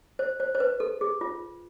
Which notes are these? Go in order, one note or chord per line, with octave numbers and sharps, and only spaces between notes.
C5
C5
C5
B4
A4
G#4
F4